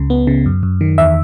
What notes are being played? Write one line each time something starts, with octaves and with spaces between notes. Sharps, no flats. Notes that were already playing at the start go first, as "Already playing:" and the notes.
Already playing: C#2 C#3
B3
C#3
F#2
F#2
D#3
E2 E5